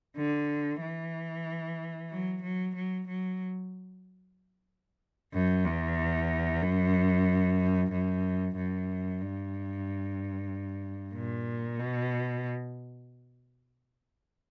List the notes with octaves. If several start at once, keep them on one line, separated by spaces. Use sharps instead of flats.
D3
E3
F#3
F#3
F#3
F#3
F#2
E2
F#2
F#2
F#2
G2
A#2
B2